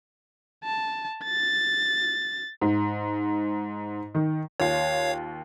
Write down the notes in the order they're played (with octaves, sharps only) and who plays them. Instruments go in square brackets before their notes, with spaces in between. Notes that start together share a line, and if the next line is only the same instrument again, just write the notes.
[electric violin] A5
A6
[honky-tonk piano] G#2
D#3
[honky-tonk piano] D#2 F4 [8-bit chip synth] C#5 F5